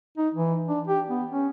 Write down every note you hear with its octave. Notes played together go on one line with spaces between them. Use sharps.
D#4
E3
D4
G4
B3
C#4